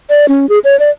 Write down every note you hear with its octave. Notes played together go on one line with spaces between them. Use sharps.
D5
C#4
G#4
C#5
D5